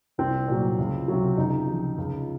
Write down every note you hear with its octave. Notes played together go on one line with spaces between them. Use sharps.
C2 C4
A#2 F#3
C#2
C3 F#3
C#2 D#4
C3 F3
C#2